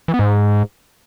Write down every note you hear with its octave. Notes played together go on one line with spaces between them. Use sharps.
E3
B3
G#2